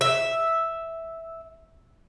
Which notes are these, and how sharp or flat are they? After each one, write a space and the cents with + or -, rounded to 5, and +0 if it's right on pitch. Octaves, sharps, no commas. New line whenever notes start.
E5 -5